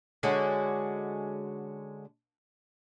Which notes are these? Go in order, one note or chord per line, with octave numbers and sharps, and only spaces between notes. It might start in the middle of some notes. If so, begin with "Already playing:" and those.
D3 G#3 C#4 F#4